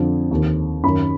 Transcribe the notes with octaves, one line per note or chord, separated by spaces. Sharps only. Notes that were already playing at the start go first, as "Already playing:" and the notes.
Already playing: F2 D3 F3
D#2 D#3
F#2 D#3 B5